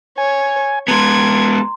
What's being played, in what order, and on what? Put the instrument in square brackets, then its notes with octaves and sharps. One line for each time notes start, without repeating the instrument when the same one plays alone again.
[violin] C#5 [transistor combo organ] G#5
[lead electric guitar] G#3 B3 [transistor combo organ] A5 [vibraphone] A#5 C6 [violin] G#6